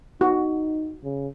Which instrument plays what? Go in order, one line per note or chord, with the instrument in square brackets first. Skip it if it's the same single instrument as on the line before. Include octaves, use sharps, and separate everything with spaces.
[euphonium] D#4 [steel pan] F#4
[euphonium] C#3